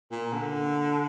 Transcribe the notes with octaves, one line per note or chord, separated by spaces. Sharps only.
A#2
D3